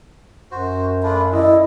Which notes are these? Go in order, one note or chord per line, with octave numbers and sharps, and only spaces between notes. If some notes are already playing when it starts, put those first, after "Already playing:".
F#2 F#4 C5
A3 D4 F4 B5
E4 D5 D#5